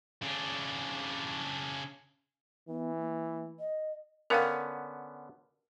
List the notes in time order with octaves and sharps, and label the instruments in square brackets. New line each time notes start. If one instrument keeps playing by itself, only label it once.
[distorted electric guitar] C#3 D4
[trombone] E3 [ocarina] B3
[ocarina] A#3
D#5
[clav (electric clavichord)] D3 B3 C#4 [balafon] A#4 F5 G5